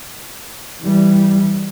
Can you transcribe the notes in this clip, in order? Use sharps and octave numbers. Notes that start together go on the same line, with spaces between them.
E3 G3